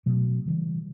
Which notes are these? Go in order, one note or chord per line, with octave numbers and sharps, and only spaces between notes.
B2 F#3 A3
C#3 E3 G3